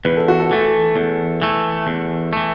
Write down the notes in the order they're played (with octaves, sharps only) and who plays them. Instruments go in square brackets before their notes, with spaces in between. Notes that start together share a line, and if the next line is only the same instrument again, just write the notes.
[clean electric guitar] E2 [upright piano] B4
[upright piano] A4
F#4
A4
[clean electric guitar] E3 A3
E2
E3 A3
E2
E3 A3